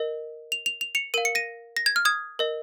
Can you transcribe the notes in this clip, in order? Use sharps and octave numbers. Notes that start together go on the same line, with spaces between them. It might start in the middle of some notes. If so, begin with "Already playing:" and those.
Already playing: A#4 D#5
F7
F7
F7
C#7 F7
A#4 F5 D#7
C#7
A#6 D#7
A#6
G#6
F6
D#6 G#6
A#4 D#5